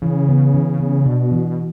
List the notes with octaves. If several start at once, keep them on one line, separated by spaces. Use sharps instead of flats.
C#3 E3
B3
E3
B3
B2 D4
E3